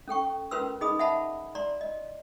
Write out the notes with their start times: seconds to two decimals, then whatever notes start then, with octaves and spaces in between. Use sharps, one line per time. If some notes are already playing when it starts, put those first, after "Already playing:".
0.08 C#4 A4 G5 C#6
0.51 C#4 F4 A#4 B4 C6 E6
0.81 D#4 G#4 D#5 B5 D#6
0.99 E5 F#5 A5 B5
1.55 D5 A#5 C6
1.81 D#5